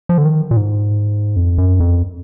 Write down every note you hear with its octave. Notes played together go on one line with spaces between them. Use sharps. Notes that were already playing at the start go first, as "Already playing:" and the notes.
F3
D3
D#3
A#2
G#2
F2
F#2
F2